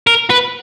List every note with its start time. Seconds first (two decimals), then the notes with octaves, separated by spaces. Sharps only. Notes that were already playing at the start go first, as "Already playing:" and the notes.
0.07 A#4
0.30 B4